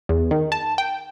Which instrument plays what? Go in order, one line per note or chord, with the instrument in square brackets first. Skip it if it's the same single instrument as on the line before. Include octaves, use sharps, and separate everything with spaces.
[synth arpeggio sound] E2
D#3
A5
G5